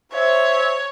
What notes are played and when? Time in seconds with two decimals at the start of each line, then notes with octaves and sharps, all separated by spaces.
0.12 C5 C#5 E5